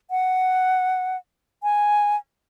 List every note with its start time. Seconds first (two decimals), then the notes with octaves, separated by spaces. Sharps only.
0.11 F#5
1.63 G#5